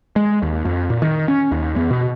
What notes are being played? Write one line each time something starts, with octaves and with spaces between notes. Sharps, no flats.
G#3
D#2
F2
A#2
D#3
C#4
D#2
E2
B2